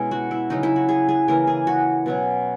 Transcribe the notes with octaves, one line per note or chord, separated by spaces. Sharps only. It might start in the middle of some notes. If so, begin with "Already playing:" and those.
Already playing: B2 G#3 C#4 E4
F#4
E4
C#3 F#3 C#4 D#4
E4
F#4
G#4
G#4
C#3 E3 A#3 A#4
G#4
F#4
B2 F#3 C#4